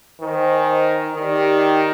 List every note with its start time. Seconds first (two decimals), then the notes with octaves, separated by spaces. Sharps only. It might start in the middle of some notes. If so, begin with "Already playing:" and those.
0.20 D#3 C5 D#5 G#5
1.16 D#3 D#4 G4 D5 G5